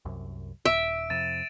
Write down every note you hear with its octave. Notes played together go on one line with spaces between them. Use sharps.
C2 F#2
D#1 E5 D7
F2 C3 A6 D#7 E7